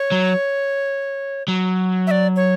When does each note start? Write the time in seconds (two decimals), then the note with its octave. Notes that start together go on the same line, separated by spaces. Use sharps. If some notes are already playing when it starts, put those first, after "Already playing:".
Already playing: C#5
0.12 F#3
1.48 F#3
2.07 E5
2.11 D5
2.36 C#5